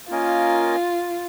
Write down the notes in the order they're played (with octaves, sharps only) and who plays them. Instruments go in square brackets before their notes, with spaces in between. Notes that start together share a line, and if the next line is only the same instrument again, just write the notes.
[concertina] A#3 C#4 A#4 D#5 G#5 [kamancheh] F4